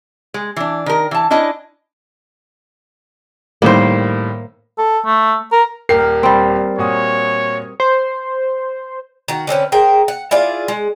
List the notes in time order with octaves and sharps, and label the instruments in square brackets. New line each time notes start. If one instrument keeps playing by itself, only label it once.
[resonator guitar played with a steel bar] G#3
E3 D4
D#3 A#4
E3 A5
C#4 D4 E4 D#5
[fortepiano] A2 D#3 G3 [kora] A#3 C5
[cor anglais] A4
A3
A#4
[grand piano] D#1 G4 C7 [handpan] A#4
[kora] G3 C4
[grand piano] A#2 F#4 D#6 [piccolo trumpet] C#5
[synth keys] C5
[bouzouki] D#3 F#4
D3 C4 C#4 B4
G#4 A#4 C5 G5
F#5
E4 F4 G#4 D5
G#3